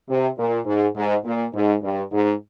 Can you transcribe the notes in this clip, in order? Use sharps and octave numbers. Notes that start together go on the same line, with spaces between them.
C3
A#2
G#2
G#2
A#2
G#2
G2
G#2